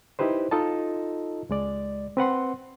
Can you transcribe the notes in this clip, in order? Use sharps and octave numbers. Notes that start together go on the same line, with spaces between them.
D#4 E4 G4 B4 C5
D#4 F4 A4 D#5 A5
C#2 G#3 D5
C4 B4 F#5 C6